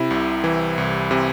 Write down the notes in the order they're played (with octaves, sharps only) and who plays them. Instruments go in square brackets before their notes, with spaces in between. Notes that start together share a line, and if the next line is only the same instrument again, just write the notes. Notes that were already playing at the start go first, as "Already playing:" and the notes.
Already playing: [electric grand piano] C3 E4
C2
E3
C2
C3